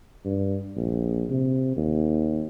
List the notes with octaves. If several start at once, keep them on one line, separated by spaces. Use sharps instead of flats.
G2
A#1
C3
D#2